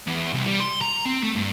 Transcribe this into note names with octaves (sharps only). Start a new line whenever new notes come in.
E2
C2
G3
C6
A#5
C4
A3
G2